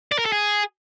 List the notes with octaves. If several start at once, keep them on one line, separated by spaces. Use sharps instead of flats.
D5
A#4
A4
G#4